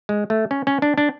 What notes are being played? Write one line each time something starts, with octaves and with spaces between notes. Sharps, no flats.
G#3
A3
C#4
C#4
D4
D4